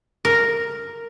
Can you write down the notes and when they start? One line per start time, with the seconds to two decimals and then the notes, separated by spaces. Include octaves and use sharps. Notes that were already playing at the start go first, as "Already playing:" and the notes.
0.25 A#4